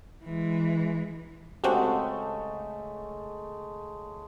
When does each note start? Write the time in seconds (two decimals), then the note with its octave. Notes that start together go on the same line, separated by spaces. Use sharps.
0.25 E3 G#3
1.64 C#3 G#3 A3 C4 F#4 G4